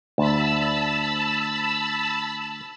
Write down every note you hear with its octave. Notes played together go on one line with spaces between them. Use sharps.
D2 A5 B5 E6